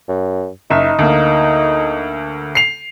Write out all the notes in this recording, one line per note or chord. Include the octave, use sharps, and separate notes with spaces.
F#2
F#1 D#4 E5
D2 A#3
C7 F7